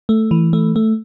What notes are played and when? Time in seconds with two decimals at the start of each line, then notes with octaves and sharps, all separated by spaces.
0.09 A3
0.31 E3
0.53 A3
0.76 A3